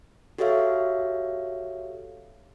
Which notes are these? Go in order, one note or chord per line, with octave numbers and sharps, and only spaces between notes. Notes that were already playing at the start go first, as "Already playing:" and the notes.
F#4 G4 A4 C#5 E5 F5